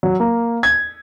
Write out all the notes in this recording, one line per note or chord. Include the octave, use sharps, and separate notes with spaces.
F#3
A#3
G#6